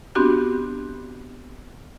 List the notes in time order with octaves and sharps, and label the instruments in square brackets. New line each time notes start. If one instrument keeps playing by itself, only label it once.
[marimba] B3 C4 D4 F#4 G4 G6